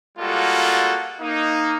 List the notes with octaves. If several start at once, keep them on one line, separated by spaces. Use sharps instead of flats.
G3 G#3 A#3 F4 F#4 A4
A#3 D#4